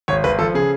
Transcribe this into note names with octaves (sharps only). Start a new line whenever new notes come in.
G#1 C#5
G#1 B4
F3 A4
C#3 G#4